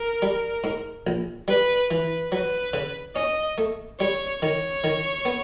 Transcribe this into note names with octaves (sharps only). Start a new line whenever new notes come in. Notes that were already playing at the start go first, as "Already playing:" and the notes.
Already playing: A#4
G3
G#2
A#1
G3 B4
E3 B4
F#3 B4
C#3
C#4 D#5
A3
G3 C#5
D#3 C#5
D#3
B3